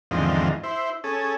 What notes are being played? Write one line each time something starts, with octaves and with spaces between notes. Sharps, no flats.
E2 G#2 D3 D#3 F3 C4
E4 C5
C#4 G#4 A4